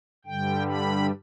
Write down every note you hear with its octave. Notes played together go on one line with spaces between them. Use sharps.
G2 D3 G3 G5
B5